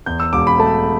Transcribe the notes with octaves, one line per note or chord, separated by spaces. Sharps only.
E2 G6
E6
E1 D6
B5
A3 A5